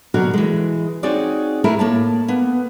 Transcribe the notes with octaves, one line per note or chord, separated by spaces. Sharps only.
B2 D3 F#3 F#4 A#4
E3 G#3
C4 D#4 F#4 G#4 C#5 D5
A3 E4 G#4 A#4
A2 A#3 C#5 A5
A#3 B3